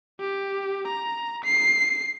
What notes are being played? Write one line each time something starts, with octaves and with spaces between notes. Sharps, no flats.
G4
A#5
C7